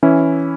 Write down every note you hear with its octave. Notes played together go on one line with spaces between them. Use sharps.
E3 C#4 E4